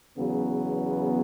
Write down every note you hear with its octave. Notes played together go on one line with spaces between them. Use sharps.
E2 C#3 F#3 B3